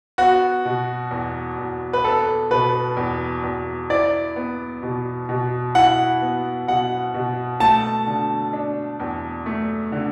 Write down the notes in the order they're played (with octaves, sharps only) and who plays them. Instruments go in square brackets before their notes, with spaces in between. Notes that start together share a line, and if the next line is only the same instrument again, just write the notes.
[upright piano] B3 [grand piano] F#4
[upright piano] B2
E2
E2
[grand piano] B4
[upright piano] B3 [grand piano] A4
[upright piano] B2 [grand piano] B4
[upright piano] E2
E2
[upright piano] E4 [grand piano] D5
[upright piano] B3
B2
B2
[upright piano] E4 [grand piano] F#5
[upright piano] B3
[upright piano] B2 [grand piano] F#5
[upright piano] B2
[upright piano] A3 [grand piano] A5
[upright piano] D3
D4
E2
A3
D3